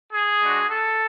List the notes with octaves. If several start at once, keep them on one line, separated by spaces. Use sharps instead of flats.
G#4
G#3 D4 F#4
A4